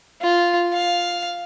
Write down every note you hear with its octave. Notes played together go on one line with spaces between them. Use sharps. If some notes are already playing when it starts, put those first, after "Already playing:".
F4
F5